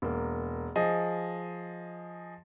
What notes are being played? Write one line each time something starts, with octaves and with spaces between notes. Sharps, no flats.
E1 A#3
F3 G#4 D#5